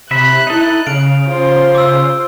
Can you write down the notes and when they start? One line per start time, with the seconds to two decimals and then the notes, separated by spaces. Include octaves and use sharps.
0.11 C3 E5 B5 F#6
0.47 D#4 E4 A4
0.87 C#3 F5 D7
1.26 F4 C5
1.75 D6 E6